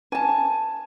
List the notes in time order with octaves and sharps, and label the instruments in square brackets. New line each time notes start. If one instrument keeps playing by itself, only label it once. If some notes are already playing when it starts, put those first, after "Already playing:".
[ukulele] G#5 A5